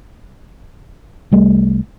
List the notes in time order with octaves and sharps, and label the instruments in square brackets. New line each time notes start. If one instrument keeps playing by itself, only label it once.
[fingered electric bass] C2 G3 A3